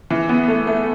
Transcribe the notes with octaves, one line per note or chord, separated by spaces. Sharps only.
E3
B3
A3
A3